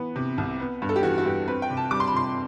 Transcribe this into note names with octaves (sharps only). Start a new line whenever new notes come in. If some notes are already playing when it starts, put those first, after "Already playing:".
Already playing: E3 B3
C3
C2
B3
G2
A4
G4
E3 F#4
F#4
G2 G4
C4 B4
G5
C3
A5
G3 D6
C6
B5
C3 C6